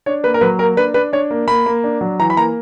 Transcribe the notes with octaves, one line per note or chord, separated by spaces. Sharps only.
D4 C#5
A#3 B4
A#4
F#3 B4
A#3 A#4
D4 B4
D4 B4
D4 C#5
A#3
A#3 B5
A#3
D4
F#3
E3 A#5
B5
A#3 A#5